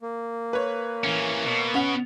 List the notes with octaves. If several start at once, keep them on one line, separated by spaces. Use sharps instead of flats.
A#3
B4 C#5
E3 C#4
B2
C#4 F#5 F7